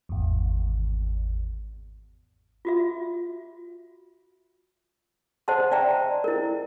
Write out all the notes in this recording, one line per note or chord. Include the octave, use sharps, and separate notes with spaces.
G#1 E2
F4 F#4 E5
C5 D#5 F#5 A5 C6
D5 E5 G5 A5 A#5
E4 A#4